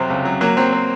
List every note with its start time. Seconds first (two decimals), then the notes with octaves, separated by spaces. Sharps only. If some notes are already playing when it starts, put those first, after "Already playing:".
Already playing: F2 C3 F#3 C4
0.10 C#2
0.25 F#3
0.41 F#3 A#3
0.57 F#3 C4
0.73 C4